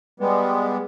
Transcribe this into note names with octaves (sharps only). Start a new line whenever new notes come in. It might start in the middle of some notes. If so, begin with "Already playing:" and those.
G3 G#3 B3